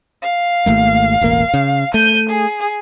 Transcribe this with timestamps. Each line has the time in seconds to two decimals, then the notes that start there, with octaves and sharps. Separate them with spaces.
0.22 F5
0.66 G#1 A3 A#3
1.21 E1 A1 A#3
1.54 C#3
1.94 A3 G6 D#7
2.29 G#4